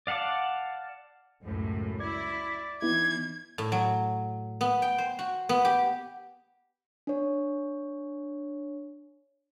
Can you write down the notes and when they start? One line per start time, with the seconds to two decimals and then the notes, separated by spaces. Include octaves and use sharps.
0.07 D5 F5 F#5 A5 D6
1.43 C#2 F#2 A2
2.00 E4 D5 G#6
2.82 E3 B3 D#4 E4 G#6
3.58 A2
3.72 F#3
4.61 B3
4.82 G5
4.98 C5
5.19 F#4
5.49 B3
5.65 G4
7.07 D4 C#5